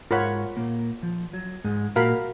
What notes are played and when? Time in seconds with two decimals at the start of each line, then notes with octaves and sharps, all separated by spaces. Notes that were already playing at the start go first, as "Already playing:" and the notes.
0.11 G#2 G#3 F4 A#4 C#5 F#5 B5
0.57 A#2 A#3
1.03 F3
1.33 F#3
1.64 G#2 G#3
1.95 A#2 A#3 F#4 A#4 F5 B5